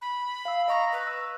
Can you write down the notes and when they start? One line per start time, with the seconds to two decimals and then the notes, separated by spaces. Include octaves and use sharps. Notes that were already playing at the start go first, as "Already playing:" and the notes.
0.01 B5
0.45 F5 E6
0.68 D#5 A#5 C#6 A#6
0.92 B4
1.07 E6